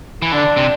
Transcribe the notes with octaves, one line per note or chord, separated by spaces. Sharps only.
E3
D3 D4
C3